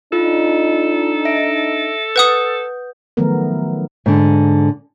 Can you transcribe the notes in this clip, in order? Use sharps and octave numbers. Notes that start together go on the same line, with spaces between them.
D4 D#4 F4 A4
E5 A#6 D7
B4 F#5 D#6 G6
D#3 F3 F#3 A3 B3 A#4
G#2 D3